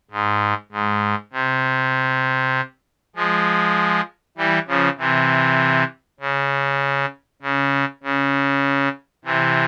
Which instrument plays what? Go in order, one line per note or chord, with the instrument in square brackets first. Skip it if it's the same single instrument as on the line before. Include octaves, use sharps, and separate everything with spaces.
[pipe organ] G#2
G#2
C3
F3 G#3
E3 G3
C#3 F3
C3 E3
C#3
C#3
C#3
C3 E3